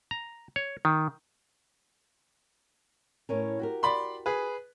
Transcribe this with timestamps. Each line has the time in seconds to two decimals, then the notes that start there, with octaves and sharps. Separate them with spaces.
0.11 A#5
0.56 C#5
0.85 D#3
3.29 A2 C#4 A#4
3.59 F#4 G4 A#4
3.83 D5 B5 C6
4.26 G#4 B4